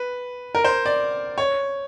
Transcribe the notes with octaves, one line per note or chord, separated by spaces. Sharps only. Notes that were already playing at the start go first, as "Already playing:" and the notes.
Already playing: B4
A#4
C5
D5
C#5